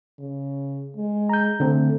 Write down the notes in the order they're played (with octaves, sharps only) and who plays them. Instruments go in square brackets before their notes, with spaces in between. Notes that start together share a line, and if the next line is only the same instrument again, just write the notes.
[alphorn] C#3
G#3
[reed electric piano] A#5 G6
[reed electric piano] D3 C4 [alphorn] A3